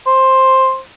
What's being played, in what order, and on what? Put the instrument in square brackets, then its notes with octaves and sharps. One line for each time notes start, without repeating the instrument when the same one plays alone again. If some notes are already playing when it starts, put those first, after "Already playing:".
[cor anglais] C5